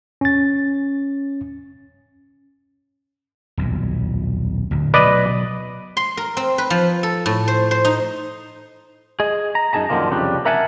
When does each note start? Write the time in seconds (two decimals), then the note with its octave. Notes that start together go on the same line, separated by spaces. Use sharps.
0.21 C#4 A6
3.57 D#1 B1 F2
4.71 D1 D2
4.94 B2 F#3 B4 D5 D#5
5.97 C6
6.17 A#4
6.37 C4
6.58 B4
6.70 F3
7.03 A4
7.26 A2
7.48 C5
7.71 C5
7.85 D#4
9.20 G#4 D#5
9.55 A#5
9.73 F#2 D#4 G#4 A5 A#5
9.89 F#2 A#2 D3 D#3 F3 A#3
10.10 C2 F2 C#3 G3 D4
10.46 A#4 E5 F#5 G#5 A5